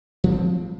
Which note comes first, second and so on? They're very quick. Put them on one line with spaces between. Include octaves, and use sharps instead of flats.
F3 A#3 G3 C4